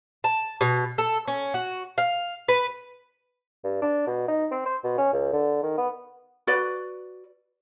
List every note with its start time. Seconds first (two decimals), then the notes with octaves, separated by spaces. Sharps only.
0.24 A5
0.61 B2
0.98 A4
1.28 C#4
1.54 F#4
1.98 F5
2.48 B4
3.64 G2
3.82 D4
4.07 B2
4.28 D#4
4.52 C4
4.66 C5
4.84 B2
4.98 C#4
5.13 C#2
5.33 D3
5.63 D#3
5.77 B3
6.47 F#4 B4 D5